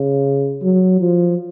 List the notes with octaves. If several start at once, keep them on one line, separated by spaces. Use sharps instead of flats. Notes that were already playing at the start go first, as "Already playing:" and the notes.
Already playing: C#3
F#3
F3